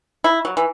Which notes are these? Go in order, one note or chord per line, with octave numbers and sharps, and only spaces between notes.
E4
F#3
E3